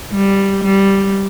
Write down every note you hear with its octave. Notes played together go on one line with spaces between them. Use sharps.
G3
G3